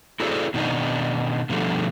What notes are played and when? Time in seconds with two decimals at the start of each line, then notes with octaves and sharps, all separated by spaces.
0.20 E4 F#4 G#4 A4 C5 D5
0.54 B2 D#3 D4 D#4
1.49 B2 D3 F3 G3 A3